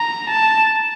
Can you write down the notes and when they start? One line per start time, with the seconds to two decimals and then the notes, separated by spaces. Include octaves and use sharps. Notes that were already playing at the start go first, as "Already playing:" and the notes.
Already playing: A#5
0.30 A5